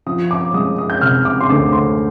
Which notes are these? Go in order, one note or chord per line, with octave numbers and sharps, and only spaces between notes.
F3 D#6
D6
G#3 D#6
D#6
G6
C3 F6
D6
C6
D2 D6
C6